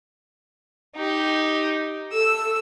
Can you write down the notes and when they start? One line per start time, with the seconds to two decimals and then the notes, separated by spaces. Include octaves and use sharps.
0.96 D#4 G4
2.13 A4 E6